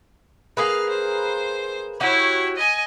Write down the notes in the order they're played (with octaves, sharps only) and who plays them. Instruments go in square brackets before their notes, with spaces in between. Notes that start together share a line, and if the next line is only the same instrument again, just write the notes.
[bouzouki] A#3 G#4 B4 [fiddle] F5
[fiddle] C5
[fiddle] E4 C#5 [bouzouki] F#4 G4
[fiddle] D#5 G#5